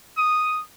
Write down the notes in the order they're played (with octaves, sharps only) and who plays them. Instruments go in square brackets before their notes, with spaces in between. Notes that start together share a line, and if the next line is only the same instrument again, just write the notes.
[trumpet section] D#6